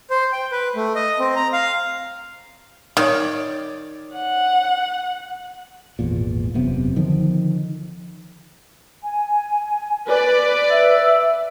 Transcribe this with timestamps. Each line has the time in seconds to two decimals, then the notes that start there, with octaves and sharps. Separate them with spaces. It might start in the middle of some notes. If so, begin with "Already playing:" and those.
0.10 C5
0.32 G5
0.52 B4
0.76 A3
0.96 D#5
1.19 C4
1.36 A#5
1.53 F5
2.97 D#3 C#5 D5
4.13 F#5
5.99 G#1 E2 A#2
6.54 E1 F#2 C3 B3
6.96 D3 D#3 F3
9.03 G#5
10.07 B4 D5
10.70 E5 E6